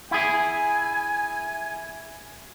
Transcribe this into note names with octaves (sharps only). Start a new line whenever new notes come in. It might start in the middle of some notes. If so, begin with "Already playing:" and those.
E4 G#4 G#5